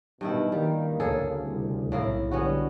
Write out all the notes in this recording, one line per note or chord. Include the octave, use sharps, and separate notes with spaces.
G2 B2 D#3 E4
D#3 G3 A#3
D2 C#3 G#4 A4
C2
B1 A2 A#3 E4 G#4
D3 G3 B3 C#4 F#4